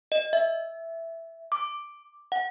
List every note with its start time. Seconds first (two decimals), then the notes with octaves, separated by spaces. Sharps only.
0.12 D#5
0.33 E5
1.52 D6
2.32 F#5